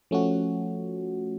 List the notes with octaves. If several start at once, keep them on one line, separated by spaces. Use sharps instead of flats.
F3 A3 C#4 F#4